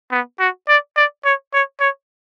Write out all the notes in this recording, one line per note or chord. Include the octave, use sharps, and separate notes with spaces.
B3
F#4
D5
D5
C#5
C#5
C#5